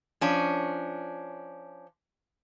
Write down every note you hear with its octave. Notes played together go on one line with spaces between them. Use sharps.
F3 C#4 D4